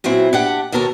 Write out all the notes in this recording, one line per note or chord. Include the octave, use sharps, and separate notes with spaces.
A#2 F#3 C4 E4
D4 G4 F#5
D#2 B2 A4 A#4 C#5 A5